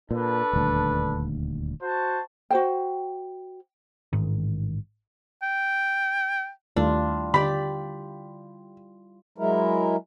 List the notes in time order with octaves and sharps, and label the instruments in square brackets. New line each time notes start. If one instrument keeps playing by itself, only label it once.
[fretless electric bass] A#2 [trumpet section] D4 A4 B4
[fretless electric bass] D#1 D2
[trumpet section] F#4 C5 A5
[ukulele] F#4 C5 G5
[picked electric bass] A1 G#2 D#3
[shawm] G5
[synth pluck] D#2 D#3 A3 [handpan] G3 E4 F4 [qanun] D4
[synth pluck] D3 [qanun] G4 D5 [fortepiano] B5
[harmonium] F#3 G#3 E4 A#4